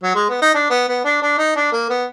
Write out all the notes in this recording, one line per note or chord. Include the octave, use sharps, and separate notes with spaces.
F#3
G#3
B3
D#4
D4
B3
B3
D4
D4
D#4
D4
A#3
B3